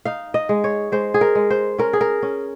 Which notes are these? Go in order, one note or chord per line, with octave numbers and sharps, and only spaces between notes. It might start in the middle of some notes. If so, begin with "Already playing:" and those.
D#4 F5
D#5
G#3
C#5
G#3 C5
G#4
A#4
G#3
C5
C#4 A#4
G#4
A#4
C#4